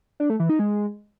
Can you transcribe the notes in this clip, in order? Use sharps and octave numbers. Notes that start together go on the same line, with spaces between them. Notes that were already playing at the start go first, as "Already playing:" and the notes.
D4
A3
E3
D#4
G#3